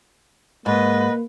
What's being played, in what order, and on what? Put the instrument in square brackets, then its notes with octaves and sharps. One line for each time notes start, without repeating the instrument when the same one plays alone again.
[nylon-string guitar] G#2 [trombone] A#3 [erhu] B4 [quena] D#5